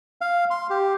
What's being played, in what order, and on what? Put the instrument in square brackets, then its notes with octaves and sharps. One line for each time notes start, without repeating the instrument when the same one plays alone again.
[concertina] F5
C6
G4